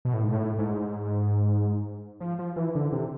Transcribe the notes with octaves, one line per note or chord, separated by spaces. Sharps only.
B2
A2
G#2
A2
G#2
F3
F3
E3
D3
C3